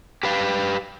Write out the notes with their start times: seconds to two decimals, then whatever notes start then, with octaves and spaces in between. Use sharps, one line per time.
0.23 G4 B4 F5